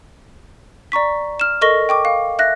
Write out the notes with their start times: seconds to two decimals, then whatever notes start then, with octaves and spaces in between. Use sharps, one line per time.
0.92 D5 A#5 C#6 B6
1.40 F6 E7
1.61 A4 A#4 D#5 C#6 A#6 G7
1.89 G5 C#6 D6
2.05 F5
2.39 E5 F#6 A#6